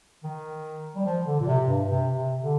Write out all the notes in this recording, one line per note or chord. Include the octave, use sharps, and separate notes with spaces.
D#3
G3
F3
D3
A#2
C3
G2
C3
C3
D3